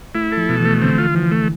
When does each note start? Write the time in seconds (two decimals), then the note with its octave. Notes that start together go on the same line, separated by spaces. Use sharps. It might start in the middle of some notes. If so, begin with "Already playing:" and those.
0.15 A3 E4
0.32 A4
0.37 F3
0.49 B2
0.59 E3
0.65 A3
0.82 D3 C4
0.98 F4
1.15 E3 F3
1.31 A3